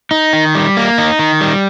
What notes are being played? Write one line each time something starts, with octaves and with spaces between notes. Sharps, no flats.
D#4
D#3
G3
A#3
D#4
D#3
G3